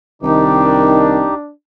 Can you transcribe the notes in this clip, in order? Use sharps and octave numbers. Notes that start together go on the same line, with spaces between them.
C2 D#3 D4 D#4 G4